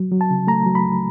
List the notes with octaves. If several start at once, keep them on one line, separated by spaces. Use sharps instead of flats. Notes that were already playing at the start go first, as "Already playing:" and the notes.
Already playing: F#3
F#3
A5
C#3
A3 A#5
F#3
B5
C#2